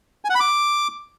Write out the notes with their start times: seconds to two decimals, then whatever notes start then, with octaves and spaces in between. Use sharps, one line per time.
0.25 G#5
0.30 F#5
0.35 B5
0.40 D6